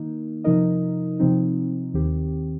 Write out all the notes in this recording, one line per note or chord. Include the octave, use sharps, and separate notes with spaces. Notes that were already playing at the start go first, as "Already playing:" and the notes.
Already playing: D#3 A#3 D#4
C3 F3 D#4 A#4 D#5
C3 F3 C4 D#4
D#2 D#3 C4 G4